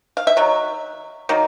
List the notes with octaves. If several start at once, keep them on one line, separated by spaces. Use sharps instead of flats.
F5
E5
D#3 F#3
D#3 F#3 A#3